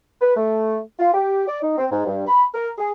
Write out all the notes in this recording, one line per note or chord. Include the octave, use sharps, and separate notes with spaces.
B4
A3
F4
G4
D5
D#4
C4
G#2
G2
B5
A#4
G#4